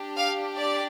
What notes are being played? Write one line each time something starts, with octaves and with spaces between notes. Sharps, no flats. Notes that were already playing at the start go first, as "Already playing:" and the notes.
Already playing: D4 G4
F5
D5